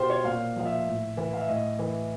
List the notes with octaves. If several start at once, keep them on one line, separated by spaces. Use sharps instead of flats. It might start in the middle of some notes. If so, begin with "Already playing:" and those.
Already playing: B2 F4 G4 C5
C#5
A#2 F5
F3 F5
E5
A2
E3
F5
E5
A2 D#5
E3